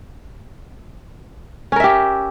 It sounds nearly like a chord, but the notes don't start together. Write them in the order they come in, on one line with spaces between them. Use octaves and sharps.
C#4 A#4 E5 G4